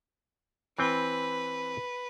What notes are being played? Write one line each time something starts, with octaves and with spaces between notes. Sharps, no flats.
E3 C4 B4 G5